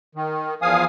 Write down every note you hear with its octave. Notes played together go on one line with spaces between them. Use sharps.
D#3
E2 F3 F5 G#5 D#6